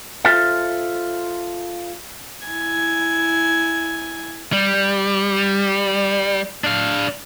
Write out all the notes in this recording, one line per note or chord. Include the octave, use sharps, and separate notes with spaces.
F4 A4 C5 E5 F5
E4 G#5
G3
D4 F5